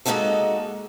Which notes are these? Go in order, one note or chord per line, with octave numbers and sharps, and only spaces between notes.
G#3 A#3 C4 D#4 F#4 A4